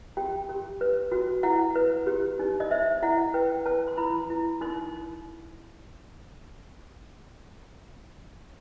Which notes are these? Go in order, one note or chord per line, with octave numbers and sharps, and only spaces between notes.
G4 G5
G4
B4
F#4
E4 F#5
B4
G4
D#4
D#5
C5 E5
E4 F#5
B4 G5
B4 A5
C6
E4 B5
E4
D#4 C6